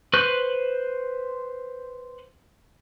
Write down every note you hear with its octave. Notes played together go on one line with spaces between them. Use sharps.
B4 C5 C#6 F#6